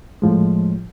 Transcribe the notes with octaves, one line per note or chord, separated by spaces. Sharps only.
A2 F3 G#3